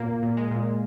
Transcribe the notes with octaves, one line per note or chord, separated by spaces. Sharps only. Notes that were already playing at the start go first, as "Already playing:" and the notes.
Already playing: A#2 A#3
A#2
G#3
A#2